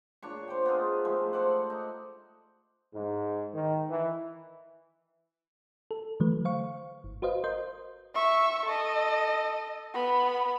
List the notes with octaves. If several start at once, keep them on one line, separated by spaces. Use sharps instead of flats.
A#2 D4 C#5 C#6
C5 D5 G5
B3 D#4 F4 G#4
F3 G#3 A3 G4
A4 C5 D5 F#5
D#4
G#2
D#3
E3
A4
D3 E3 F#3 A3 B4
C5 F5 C#6
G1
F#4 B4 C5 D#5 F5
A#4 C5 D#5 C6 G6
E5 C#6
A4 D#5
B3 B5